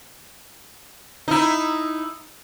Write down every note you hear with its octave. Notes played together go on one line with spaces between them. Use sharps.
D#4 E4